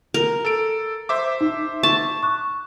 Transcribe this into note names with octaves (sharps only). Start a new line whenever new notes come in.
A#4
A4 D7
C5 E5 D6
D#4
A5 C#6
C#6 D6 F#6